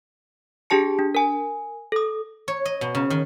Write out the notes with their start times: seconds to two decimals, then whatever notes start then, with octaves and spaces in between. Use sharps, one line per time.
0.70 D4 G4 G#4 A5 C#7
0.99 D4
1.15 A#4 G#5
1.92 A4 D#6
2.48 C#5
2.65 D#5
2.81 B2
2.95 C#3
3.10 D#3